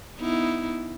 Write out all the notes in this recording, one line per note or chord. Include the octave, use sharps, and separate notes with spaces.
B3 D#4 E4